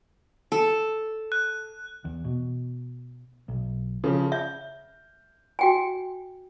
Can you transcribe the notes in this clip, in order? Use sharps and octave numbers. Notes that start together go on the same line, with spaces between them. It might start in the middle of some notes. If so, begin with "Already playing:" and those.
A4
F#6
E2
B2
B1
C#3 F3
E5 G6
F#4 G5 G#5